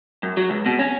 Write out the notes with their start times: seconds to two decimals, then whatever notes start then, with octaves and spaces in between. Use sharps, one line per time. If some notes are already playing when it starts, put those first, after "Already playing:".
0.23 F#2
0.37 F#3
0.50 C#2
0.66 B2
0.79 C#4